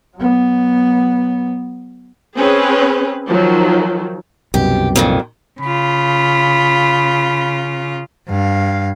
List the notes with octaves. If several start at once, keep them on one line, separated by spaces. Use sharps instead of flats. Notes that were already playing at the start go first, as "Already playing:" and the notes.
F#3 B3
C4 C#4 G#4 B4
D#3 F3 F#3
C2 F#2 B2 G4
F2 A#2 D#3
C#3 F4 B5
G2 F5